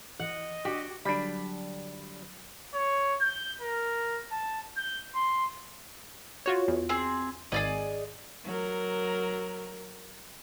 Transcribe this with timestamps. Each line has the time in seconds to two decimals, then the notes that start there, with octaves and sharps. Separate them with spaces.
0.20 E3 D#5 F#5
0.65 D4 F#4 G4
1.05 D3 F#3 G3 D4 B5
2.74 C#5
3.21 G6
3.61 A#4
4.32 A5
4.77 G6
5.15 C6
6.46 F4 F#4 C#5
6.68 E2
6.89 C4 G#4
7.52 G#1 G#4 D5 D#5
8.45 F#3 A#4